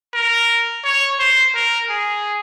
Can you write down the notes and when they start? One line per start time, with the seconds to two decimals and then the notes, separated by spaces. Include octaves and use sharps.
0.14 A#4
0.84 C#5
1.19 C5
1.55 A#4
1.89 G#4